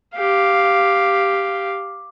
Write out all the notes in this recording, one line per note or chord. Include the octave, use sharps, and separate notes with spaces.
G4 F5